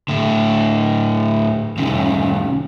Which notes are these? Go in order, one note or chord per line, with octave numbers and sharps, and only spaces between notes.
A2 D3
C2 D#3 C#4